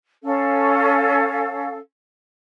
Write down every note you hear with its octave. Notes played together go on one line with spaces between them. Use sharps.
C#4 A4 F5